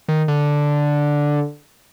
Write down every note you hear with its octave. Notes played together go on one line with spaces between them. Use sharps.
D#3
D3